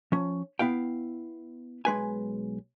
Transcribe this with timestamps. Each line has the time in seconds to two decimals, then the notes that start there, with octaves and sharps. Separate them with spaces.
0.12 F3 C#4
0.59 B3 E4 F5 G5
1.85 B1 G#3 B4 G#5